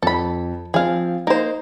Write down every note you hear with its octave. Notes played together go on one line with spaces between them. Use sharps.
F2 A4 B5
F3 C4 G#4 F5
A#3 D#4 C5